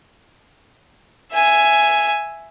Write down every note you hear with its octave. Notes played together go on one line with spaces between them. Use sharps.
E5 G#5